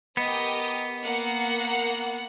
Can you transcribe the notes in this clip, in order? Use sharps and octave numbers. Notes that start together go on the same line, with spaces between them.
B3 G4 A#4 D#5
A#3 F#5 C#7